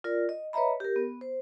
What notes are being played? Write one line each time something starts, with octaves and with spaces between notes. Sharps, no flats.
F4 A#4 D5
D#5
B4 C#5 D#5 E5 A#5 B5
G4 A#4
B3
C5